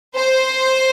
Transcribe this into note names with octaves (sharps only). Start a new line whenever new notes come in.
C5